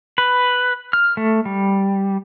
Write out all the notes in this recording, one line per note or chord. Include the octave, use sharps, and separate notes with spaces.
B4
F6
A3
G3